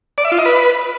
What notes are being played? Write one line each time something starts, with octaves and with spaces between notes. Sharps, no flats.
D5
E5
F4
D#5
B4